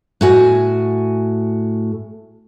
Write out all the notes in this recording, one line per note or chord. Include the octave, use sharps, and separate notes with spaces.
A2 F#4 G#5